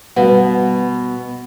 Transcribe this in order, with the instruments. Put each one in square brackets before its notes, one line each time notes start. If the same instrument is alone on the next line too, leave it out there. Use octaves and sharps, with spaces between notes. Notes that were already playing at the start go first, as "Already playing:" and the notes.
[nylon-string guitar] B2 [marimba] G3 B4 F#5